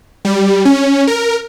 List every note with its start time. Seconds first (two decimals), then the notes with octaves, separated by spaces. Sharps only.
0.25 G3
0.65 C#4
1.07 A#4